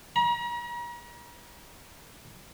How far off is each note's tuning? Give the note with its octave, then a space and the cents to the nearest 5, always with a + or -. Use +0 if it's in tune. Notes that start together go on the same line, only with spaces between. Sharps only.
A#5 +40